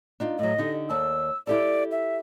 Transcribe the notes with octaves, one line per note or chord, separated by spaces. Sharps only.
D4 D#4 F4
A2 F#3 D#5
D3 D#4 G4
D#2 D5 A5 E6
E4 G4 A4 D5
E5